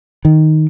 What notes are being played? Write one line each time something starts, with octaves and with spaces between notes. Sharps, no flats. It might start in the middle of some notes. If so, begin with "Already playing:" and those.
D#3